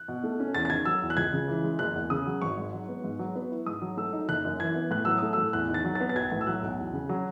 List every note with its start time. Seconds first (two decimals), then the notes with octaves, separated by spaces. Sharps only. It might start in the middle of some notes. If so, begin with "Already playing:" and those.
Already playing: F#6
0.08 B2
0.24 A3
0.40 C#4
0.55 E2 A6
0.65 A6
0.70 D#3 G#6
0.85 F#3 E6
1.02 E2
1.10 F#6
1.17 C#2 G#6
1.33 C#3
1.48 E3
1.64 G#3
1.79 F#1 F#6
1.95 E2
2.10 C#3 D#6
2.26 F#3
2.42 G#1 C#6
2.57 G#2
2.73 F#3
2.88 B3
3.04 G#2
3.19 F#3
3.35 B3
3.51 E4
3.66 G#2 D#6
3.82 F#3
3.97 A3 E6
4.13 D#4
4.29 F#1 F#6
4.45 F#2
4.60 E3 G#6
4.75 B3
4.91 A2 F#6
5.05 F#3 E6
5.18 A3 D#6
5.33 A2 E6
5.53 E2 F#6
5.68 D#3
5.74 A6
5.85 F#3
5.95 B3 A6
6.09 A6
6.16 B1 G#6
6.32 A2
6.41 E6
6.47 F#3 F#6
6.62 B1
6.78 E2
6.93 C#3
7.09 F#3